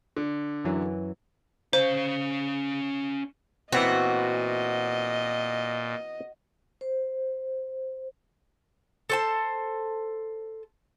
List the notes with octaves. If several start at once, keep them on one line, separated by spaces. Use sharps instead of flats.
D3
F#2 E3 F#3
C#4 C5 F5
A#2 E3 B3 C4 F#4 D#5
C5
A4 C5 A5